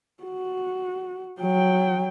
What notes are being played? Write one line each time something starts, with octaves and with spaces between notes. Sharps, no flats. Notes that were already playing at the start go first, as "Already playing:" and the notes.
F#4
F#3 G5